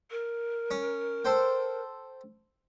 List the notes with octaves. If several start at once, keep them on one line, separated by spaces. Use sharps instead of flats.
A#4
C#4
A4 C5 G5